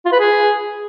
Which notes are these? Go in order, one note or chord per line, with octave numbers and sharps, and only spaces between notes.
F4
B4
G#4